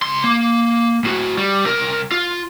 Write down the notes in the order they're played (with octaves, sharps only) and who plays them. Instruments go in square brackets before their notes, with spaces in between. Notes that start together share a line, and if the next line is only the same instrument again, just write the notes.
[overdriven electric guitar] C#2 C6
A#3
A2 F#4
G3
C2 A#4
F4